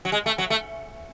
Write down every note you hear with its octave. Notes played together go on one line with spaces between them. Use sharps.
F#3
G#3
A3
F#3
A3